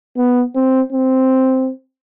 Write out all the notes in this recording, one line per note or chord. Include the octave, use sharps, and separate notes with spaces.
B3
C4
C4